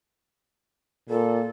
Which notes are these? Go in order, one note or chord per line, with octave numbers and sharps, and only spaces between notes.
A#2 A4